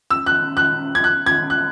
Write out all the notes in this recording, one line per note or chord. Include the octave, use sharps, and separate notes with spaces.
E6
F#6
F#6
G#6
F#6
G#6
F#6